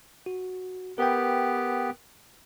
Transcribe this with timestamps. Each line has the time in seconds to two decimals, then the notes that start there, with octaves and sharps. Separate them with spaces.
0.26 F#4
0.98 B3 G4 A#4 B4 G5